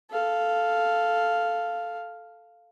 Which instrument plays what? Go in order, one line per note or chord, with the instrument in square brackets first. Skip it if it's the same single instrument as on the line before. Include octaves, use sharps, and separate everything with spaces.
[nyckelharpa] A4 F5